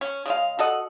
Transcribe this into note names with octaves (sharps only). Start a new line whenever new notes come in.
C#4
C#3 G#3 F5
F#4 A4 D#5 F#5